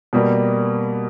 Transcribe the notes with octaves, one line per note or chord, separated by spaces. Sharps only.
B2 G3 A#3